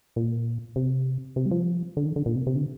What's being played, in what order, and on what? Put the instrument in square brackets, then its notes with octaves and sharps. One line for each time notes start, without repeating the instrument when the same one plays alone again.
[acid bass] A#2
C3
C3
G3
F3
D3
D#3
D3
A#2
C3
C3
D3